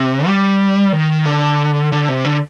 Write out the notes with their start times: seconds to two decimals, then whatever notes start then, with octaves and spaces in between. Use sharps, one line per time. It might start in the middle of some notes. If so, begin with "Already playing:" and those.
Already playing: C3
0.26 G3
0.93 D#3
1.25 D3
1.92 D3
2.08 C3
2.25 D3